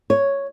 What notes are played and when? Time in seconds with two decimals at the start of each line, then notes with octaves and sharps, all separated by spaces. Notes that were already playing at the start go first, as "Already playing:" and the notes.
0.10 C#5